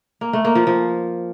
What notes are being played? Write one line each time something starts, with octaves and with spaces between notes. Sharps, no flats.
A#3
A3
A#3
F3
F3